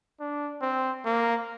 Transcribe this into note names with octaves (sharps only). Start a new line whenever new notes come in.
D4
C4
A#3